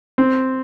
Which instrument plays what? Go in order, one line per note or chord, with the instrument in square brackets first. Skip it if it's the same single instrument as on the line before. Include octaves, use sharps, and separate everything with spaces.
[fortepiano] C4